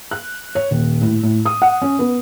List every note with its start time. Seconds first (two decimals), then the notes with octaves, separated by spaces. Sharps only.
0.11 F#6
0.55 C#5
0.71 D#1
1.01 A2
1.23 A2
1.46 D#6
1.62 F#5
1.82 C#4
1.99 B3